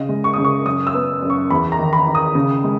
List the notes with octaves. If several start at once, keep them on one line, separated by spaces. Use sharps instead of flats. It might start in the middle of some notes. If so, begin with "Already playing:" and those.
Already playing: C#3 D#5
G#3
C#6
C#3 D#6
C#6
F#2 D#6
E6
B3
F#2
C#6
E2 B5
A#5
D#3
B5
D#3
D#6
C#3
G#3